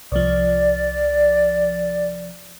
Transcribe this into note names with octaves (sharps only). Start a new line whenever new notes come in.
C2 F3 D5